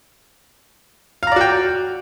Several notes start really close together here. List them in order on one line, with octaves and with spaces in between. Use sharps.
F5 A#5 D5 F#4 G5